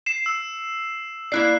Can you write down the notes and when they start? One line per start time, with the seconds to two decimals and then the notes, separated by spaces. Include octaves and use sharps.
0.06 C7 E7
0.26 E6
1.32 A#3 E4 D5 F#6 C7